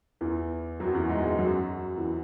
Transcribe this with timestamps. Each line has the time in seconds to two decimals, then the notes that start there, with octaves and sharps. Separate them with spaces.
0.21 E2 E3
0.80 F#2 F#3
0.95 E2 E3
1.09 G#2 G#3
1.24 G#2 G#3
1.39 F#2 F#3
1.98 E2 E3